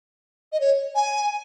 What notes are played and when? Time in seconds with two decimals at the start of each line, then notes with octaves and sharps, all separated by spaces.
0.52 D#5
0.60 C#5
0.95 G#5